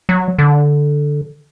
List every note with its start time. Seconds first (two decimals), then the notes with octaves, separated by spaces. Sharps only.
0.09 F#3
0.38 D3